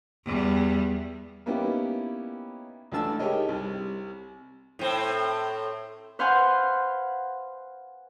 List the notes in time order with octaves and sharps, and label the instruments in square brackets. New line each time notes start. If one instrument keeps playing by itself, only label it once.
[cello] E2 G3
[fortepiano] A#3 B3 C#4 D#4 E4 G4
C#2 E3 A3 D4 A5 E6
D#4 G4 G#4 A#4 C#5 D#5
C2
[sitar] A2 C4
[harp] B4 C5 F5 F#5 G#5 C6